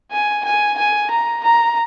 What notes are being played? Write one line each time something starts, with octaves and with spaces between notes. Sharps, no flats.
G#5
G#5
G#5
A#5
A#5